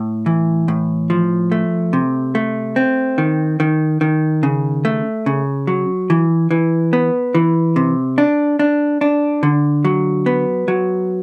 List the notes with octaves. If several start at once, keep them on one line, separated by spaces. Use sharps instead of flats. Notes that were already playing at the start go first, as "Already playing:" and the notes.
Already playing: A2
E3
A2
F3
A3
C3
A3
C4
D#3
D#3
D#3
C#3
A3
C#3
F#3
E3
E3
B3
E3
C3
D4
D4
D4
D3
F#3
B3
F#3